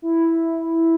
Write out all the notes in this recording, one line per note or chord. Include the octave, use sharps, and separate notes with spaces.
E4